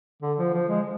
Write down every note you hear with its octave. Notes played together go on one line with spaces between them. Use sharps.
D3
F3
F3
G#3